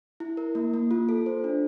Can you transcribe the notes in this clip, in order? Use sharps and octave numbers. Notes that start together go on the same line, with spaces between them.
E4
A#4
A#3
A#3
F4
A4
C5
D4